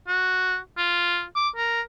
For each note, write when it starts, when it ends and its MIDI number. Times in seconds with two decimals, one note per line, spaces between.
0.08 0.57 66
0.78 1.24 65
1.35 1.49 86
1.56 1.81 70